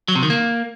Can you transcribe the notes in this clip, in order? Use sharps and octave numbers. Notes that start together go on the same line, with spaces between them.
F#3
C3
D#3
A#3